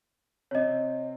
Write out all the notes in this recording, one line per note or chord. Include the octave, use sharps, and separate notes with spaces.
C3 C4 C#5 D#5